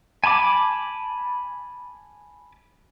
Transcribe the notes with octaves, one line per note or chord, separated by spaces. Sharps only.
G#5 A5 B5 D6